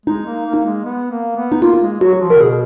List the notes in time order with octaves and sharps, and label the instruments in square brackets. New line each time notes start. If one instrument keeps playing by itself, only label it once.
[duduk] G#3 [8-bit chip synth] D#4
[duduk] A#3
A#3
G#3
B3
A#3
B3
[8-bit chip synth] D#4
[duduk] A#3 [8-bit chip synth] F4
[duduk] G#3
[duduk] F#3 [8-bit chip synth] F#4
[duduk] F3
[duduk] D3 [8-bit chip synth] A#4
[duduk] B2 [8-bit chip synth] G#4